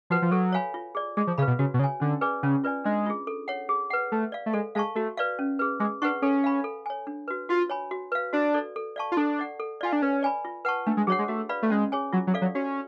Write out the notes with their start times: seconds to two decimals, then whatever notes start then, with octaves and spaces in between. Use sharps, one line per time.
0.10 F3 F#4 B4 F#5
0.22 F3
0.31 F#3 A4
0.52 C#5 F5 G#5 B5
0.74 F4
0.95 G#4 D5
1.17 G#3 G#4
1.27 F3
1.38 C#3 B4 F5 B5
1.47 B2
1.59 C#3 F#4
1.74 B2
1.79 C#3 C#5 G#5
2.00 D3 C#4
2.21 G#4 B4 D5 G#5
2.43 C#3 C#4
2.64 F4 B4 D5 G#5
2.84 G#3 D4
3.06 F4 G#4
3.27 A4
3.48 C#5 F#5
3.69 G#4
3.90 B4 F#5
4.12 A3 B4
4.32 D5 F5
4.46 A3
4.53 G#3 A4
4.75 G#3 F5 A5 C#6
4.95 A3 F#4
5.17 B4 D5 F5
5.39 C#4
5.59 G#4 B4
5.80 G#3 G#4
6.02 D4 B4 F#5 C#6
6.22 C#4 A4
6.44 F5 G#5 B5
6.64 A4
6.86 C#5 G#5
7.07 D4
7.28 F#4 B4
7.49 F4 F#4
7.70 C#5 G#5 B5
7.91 F#4
8.12 B4 F5
8.33 D4 F#4
8.54 A4 D5
8.76 A4
8.96 D5 F5 A5 C#6
9.12 F4
9.17 D4 A4
9.39 D5 F#5
9.60 A4
9.81 F4 D5 F5 G#5
9.93 D4
10.02 C#4 B4
10.23 D5 G#5 B5
10.45 F4
10.65 B4 F#5 A5 C#6
10.87 A3 D4
10.97 G#3
11.07 F#3 G#4 C#5 F#5
11.19 G#3
11.28 A3 F#4
11.49 B4 D5 F5 B5
11.62 A3
11.70 G#3 C#4
11.92 G#4 C#5 G#5
12.13 F#3 F4
12.27 F#3
12.34 A4 D5 F5
12.42 F#3
12.55 C#4 F#4